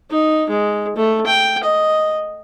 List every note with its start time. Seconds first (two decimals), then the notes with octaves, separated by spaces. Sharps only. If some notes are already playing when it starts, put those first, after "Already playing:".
0.11 D#4
0.50 G#3
0.96 A3
1.26 G5
1.64 D#5